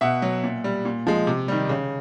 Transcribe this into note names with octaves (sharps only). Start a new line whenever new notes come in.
B2 E5 F#5
F#3
A#2
G3
A#2
F3 G#3
C3
D#3 G3
C#3